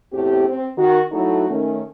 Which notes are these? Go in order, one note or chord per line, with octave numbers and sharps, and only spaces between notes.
E2 A2 C4 G4
C4
D#3 F#4
F#3 A3 D#4 E4 F#4 A4
D#3 A3 C#4